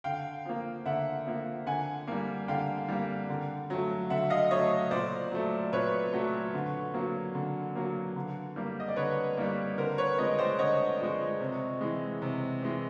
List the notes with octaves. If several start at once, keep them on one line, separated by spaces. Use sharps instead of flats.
D3 F5 G5
F3 A#3
D3 E5 F#5
F3 A#3
D3 F#5 G#5
G3 A#3
D3 F5 G5
G3 A#3
D3
F#3 A3
D3 E5 F#5
D#5 F5
F#3 A3 C#5 D#5
A#2 C5 D5
F#3 A3
A#2 B4 C#5
F#3 A3
D3
F#3 A#3
D3
F#3 A#3
D3
G3 A#3
D#5
D5
D3 B4 C#5
G3 A#3
D3 A#4 C5
B4 C#5
F3 G#3 C#5 D#5
C5 D5
D3 C#5 D#5
F3 G#3
C3
E3 G#3
C3
E3 G#3